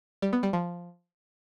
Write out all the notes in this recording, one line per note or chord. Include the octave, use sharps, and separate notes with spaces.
G3
B3
G3
F3